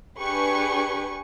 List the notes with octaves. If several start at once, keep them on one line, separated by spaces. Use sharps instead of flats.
D4 G4 G#4 B4 G#5 C#6